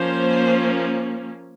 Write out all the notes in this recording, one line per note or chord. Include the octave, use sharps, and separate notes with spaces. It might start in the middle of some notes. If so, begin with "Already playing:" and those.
Already playing: F3 A#3 C#4 C5